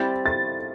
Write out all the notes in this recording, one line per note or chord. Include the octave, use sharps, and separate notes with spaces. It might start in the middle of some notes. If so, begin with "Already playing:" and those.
Already playing: G3 C4 E4 G4 A6
A6